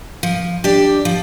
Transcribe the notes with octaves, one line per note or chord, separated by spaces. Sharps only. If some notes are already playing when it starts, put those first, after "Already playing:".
F3
D4 G4 D5
F3